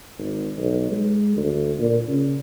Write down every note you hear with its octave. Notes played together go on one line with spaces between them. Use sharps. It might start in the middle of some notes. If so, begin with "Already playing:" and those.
G#1
B1
G#3
D2
A#2
C#3